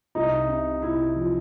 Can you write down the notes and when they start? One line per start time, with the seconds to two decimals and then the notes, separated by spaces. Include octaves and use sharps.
0.15 C2 D#4
0.48 C3
0.82 C2 E4
1.16 F3